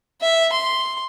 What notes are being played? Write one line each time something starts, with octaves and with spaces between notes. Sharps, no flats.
E5
C6